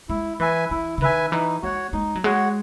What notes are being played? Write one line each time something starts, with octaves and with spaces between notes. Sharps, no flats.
G#3 E4
E3 B4 E5 G#5
E3 E4
C#3
D#3 B4 E5 G#5
E3 D#4
G#3 F#4 C#5 F#5
G#3 D#4
F#3
G#3 F#4 C#5 F#5